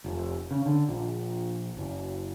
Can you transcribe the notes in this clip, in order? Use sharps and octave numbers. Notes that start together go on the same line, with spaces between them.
F1
C#3
D3
A#1
F#1